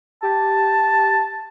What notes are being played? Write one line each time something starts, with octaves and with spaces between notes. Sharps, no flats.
G4 A5